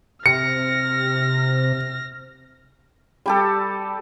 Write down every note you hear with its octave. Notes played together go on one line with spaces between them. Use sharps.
C3 F6 A#6 C#7
G3 G4 A4